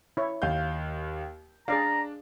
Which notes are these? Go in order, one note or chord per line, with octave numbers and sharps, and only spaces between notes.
E4 C#5
D#2 F5 G6
D4 G#4 D5 F5 A#5